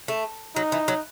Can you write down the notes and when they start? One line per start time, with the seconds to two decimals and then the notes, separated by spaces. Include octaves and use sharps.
0.08 A3
0.56 F#3 D#4
0.72 E3
0.88 F#3